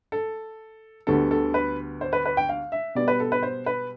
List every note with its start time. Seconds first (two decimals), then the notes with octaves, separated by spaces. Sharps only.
0.12 A4
1.07 D2 D3 G3 B3 A4
1.31 A4
1.54 B4
2.01 C5
2.13 B4
2.26 B4
2.37 G5
2.49 F5
2.72 E5
2.95 B2 G3 B3 D5
3.08 B4
3.20 A4
3.32 B4
3.43 C5
3.66 B4